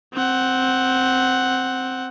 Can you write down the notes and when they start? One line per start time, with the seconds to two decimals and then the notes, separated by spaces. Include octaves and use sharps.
0.14 C4 F#5